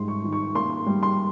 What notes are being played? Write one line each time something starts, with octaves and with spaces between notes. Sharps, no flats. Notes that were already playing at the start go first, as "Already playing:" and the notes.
Already playing: G#2 G3 C6
C#6
D#3
C#6
A#3 C6
G3
C6